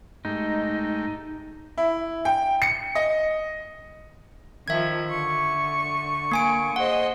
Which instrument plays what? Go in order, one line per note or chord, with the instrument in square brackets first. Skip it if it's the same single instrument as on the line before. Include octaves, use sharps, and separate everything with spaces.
[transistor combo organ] G#2 A3 G4 [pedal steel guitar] D#4
[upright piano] E4
G5
C#7
D#5
[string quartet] D#3 F3 [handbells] E5 G#6
[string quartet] D3 C#6
[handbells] A#3 G#5 D7
[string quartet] G#4 C5 D#5 [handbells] F#5